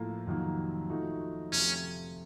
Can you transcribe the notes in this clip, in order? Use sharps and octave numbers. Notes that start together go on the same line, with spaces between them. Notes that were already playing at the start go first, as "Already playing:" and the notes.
Already playing: A2 F3 A#3 F4 A4
F2 C3 D#3 F#3 A#3
F3 A3 D#4 F#4
F2 C3 F3 A3 C#4